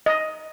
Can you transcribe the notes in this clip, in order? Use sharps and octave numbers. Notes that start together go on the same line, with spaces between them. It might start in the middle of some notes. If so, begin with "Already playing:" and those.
D#5